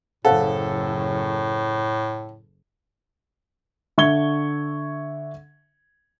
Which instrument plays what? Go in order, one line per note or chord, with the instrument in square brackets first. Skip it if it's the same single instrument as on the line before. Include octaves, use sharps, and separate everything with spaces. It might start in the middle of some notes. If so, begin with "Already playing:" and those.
[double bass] F#1 [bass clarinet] A2 [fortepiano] A4 [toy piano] C5 F5 F#5
[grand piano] D3 E5 C#6 G#6 G7